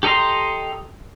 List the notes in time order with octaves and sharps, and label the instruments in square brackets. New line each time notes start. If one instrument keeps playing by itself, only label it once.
[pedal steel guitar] G4 A4 D#5 A#5 C6